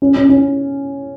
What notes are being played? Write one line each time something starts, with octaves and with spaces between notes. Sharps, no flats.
C#4
C#4
C#4